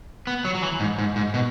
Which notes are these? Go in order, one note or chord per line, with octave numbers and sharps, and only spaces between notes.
B3
F#3
F#3
E3
G#2
G#2
G#2
B2